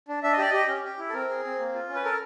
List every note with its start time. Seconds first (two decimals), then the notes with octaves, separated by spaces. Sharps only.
0.08 D4
0.23 D4 E5
0.33 D#5
0.38 G4 D5
0.50 G4 D#5
0.68 C#4
0.84 G4
0.99 E4
1.09 A4
1.14 C4 A#4
1.29 G#4
1.44 C4
1.59 A#3
1.75 F4
1.89 C#4
1.95 B4
2.04 A4 A#4